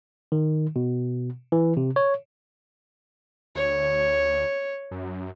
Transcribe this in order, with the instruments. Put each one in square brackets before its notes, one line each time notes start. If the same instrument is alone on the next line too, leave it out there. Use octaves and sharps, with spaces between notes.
[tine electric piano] D#3
B2
E3
C3
C#5
[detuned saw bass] D2 [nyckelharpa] C#5
[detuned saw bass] F#2